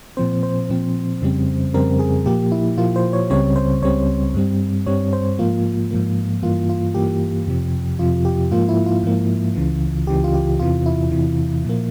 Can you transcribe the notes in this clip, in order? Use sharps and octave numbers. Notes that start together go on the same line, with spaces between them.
A#2 F3 C4 C5
C5
A#2 F3 C4
F2 C#3 G3 C4
F2 C#3 G3 C4 A#4
G#4
A#2 F3 A#3 G4
E4
A#2 F3 A#3 F4
C5
C#5
C#2 C#3 G3 C4 C#5
C5
C#2 C#3 G3 C4 C#5
G2 G3 C4
G2 G3 C4 C#5
C5
G#2 F3 A#3 F4
G#2 F3 A#3
G2 E3 A#3 F4
F4
G2 E3 A#3 G4
F2 C3 F3
F2 C3 F3 F4
G4
G#2 F3 A#3 F4
E4
F4
G#2 F3 A#3
C#2 C#3 E3
C#2 C#3 E3 G4
F4
G4
E2 C3 E3 F4
E4
E2 C3 E3
A#2 F3 A#3